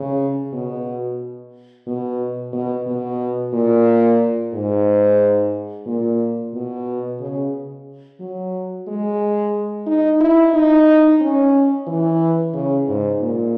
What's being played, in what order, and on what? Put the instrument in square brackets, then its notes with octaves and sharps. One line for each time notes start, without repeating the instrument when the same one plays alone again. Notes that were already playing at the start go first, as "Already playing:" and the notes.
Already playing: [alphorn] C#3
B2
B2
B2
B2
A#2
G#2
A#2
B2
C#3
F#3
G#3
D#4
E4
D#4
C#4
E3
C#3
G#2
A#2